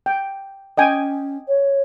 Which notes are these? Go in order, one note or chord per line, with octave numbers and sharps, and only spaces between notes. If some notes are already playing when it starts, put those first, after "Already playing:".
G5
C#4 D#5 G5 G#5
C#5